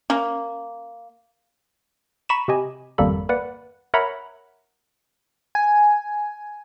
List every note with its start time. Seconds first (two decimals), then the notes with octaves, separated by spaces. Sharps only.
0.10 A#3 C#4
2.29 A#5 B5 C#6 B6 D#7 E7
2.48 C3 G4 D#5 G#5
2.98 G#1 F2 G3 A#3 A4 B5
3.29 A#3 B4 D5 F#5
3.94 A#4 C#5 E5 F#5 A#5 B5
5.55 G#5